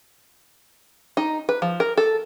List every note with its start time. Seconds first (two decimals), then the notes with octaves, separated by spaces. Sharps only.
1.17 D#4
1.49 B4
1.62 F3
1.80 A#4
1.97 A4